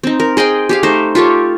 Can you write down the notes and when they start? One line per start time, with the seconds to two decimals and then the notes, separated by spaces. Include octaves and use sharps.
0.03 C4 D#4
0.20 A#4
0.37 G#4 D#5 G5 C6
0.69 G4 G#4 F5
0.83 A3 D#4 C5
1.15 F4 G4 A4 C#5